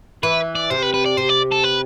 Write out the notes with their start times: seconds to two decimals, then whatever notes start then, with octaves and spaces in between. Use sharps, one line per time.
0.23 E3 B4
0.55 D5
0.70 C3 C5
0.82 B4
0.94 B4
1.06 D5
1.17 C3 C5
1.29 D5
1.52 A4
1.64 B4